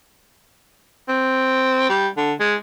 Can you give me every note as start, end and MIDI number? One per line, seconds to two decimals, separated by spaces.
1.08 1.88 60
1.89 2.08 55
2.17 2.33 50
2.40 2.55 56